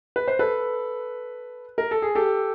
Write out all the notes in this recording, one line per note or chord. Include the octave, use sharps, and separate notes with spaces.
B4
C5
A4 B4
A#4
A4
G#4
G4 A4